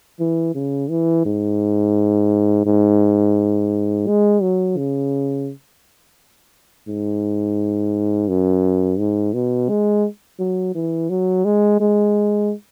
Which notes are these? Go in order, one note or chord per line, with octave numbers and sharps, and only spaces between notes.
E3
C#3
E3
G#2
G#2
G#3
F#3
C#3
G#2
F#2
G#2
B2
G#3
F#3
E3
F#3
G#3
G#3